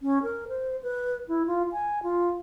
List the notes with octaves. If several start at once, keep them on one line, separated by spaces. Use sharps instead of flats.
C#4
A#4
C5
B4
E4
F4
G#5
F4